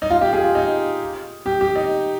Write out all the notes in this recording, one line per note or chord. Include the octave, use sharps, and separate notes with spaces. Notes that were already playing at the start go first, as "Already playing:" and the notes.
D#4
F4
G4
G#4
F4
D#4
G4
G4
D#4